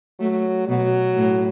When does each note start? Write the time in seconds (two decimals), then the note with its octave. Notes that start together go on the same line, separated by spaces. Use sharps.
0.20 F#3 A3
0.67 B2 F#3
1.16 A2